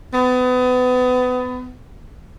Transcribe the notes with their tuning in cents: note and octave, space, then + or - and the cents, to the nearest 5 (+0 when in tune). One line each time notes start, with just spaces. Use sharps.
B3 +30